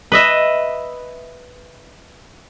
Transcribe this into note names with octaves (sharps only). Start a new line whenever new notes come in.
B4 D#5 E5